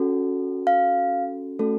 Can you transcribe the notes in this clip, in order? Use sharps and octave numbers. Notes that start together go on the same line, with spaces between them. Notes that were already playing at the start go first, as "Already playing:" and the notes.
Already playing: C#4 F#4 A4
F5
A3 C#4 F#4 A4